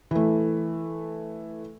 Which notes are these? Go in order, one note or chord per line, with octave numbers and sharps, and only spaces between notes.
E3 A3